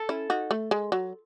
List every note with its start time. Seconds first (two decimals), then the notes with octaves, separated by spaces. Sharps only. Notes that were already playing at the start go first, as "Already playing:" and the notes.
Already playing: A4
0.09 C#4 E4
0.30 D#4 F#4
0.51 A3
0.71 G#3
0.92 F#3